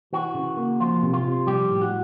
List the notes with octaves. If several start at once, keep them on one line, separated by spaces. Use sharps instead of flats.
E3 F#4
C#3
A#3
F3 F4
C3
F4
C3
F3 G3 G4
A2
F#4